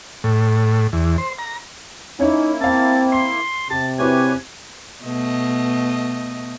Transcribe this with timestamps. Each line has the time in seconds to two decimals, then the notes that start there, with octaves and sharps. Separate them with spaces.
0.24 A2
0.93 E2
1.18 C5
1.39 A#5
2.19 A#3 C#4 D#4 E4 C#5
2.61 C4 F5 A5 E6
3.12 C6 C7
3.70 C3 G4 A5
3.99 C4 E4 F#4 G4 B4 C#5 G#5
5.04 B2 A3 D#5